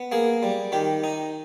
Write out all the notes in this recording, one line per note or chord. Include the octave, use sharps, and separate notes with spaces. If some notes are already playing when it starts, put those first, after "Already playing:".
Already playing: B3
A#3 G#4
G3
D#3 G4
D#4